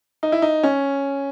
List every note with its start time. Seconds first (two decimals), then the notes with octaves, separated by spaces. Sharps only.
0.23 D#4
0.32 E4
0.42 D#4
0.63 C#4